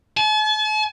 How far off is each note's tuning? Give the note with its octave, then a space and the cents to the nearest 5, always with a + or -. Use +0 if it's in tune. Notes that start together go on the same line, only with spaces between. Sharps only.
A5 -45